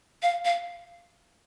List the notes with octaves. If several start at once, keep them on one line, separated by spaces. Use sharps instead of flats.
F5
F5